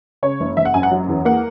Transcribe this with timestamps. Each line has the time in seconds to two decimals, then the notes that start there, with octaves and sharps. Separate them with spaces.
0.23 C#3 C#5
0.40 F#1
0.57 F#1 E5
0.65 F#5
0.74 F#2 G#5
0.83 F#5
0.91 F#3
1.08 E2
1.25 A#3 F#5